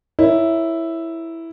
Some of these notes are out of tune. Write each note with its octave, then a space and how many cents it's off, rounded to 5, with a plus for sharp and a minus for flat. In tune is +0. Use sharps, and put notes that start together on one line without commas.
E4 +0 A#4 +10 C#5 +0